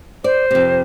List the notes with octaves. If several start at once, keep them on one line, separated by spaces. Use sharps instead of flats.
C5 D5
F2 C3